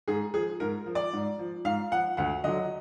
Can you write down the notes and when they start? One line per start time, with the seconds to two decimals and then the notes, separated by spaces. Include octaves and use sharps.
0.08 G#2 G#4
0.34 F3 G#4
0.60 G#2 A#4
0.86 F3
0.95 D5
1.13 G#2
1.39 F3
1.65 G#2 F5
1.91 F3 F#5
2.17 D2 F#5
2.44 D3 F#3 D#5